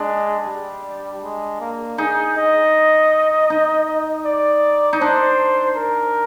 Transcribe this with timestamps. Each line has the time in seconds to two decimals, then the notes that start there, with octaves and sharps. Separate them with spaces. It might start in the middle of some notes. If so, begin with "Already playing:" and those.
Already playing: G#3 D4
0.47 G3
1.23 G#3
1.61 A#3
1.98 D#4 G#4
2.37 D#5
3.50 D#4
4.26 D5
4.93 D#4
5.01 D4 C5
5.77 A#4